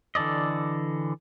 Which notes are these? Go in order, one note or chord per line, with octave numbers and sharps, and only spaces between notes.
D3 E3 A4 D5 D#5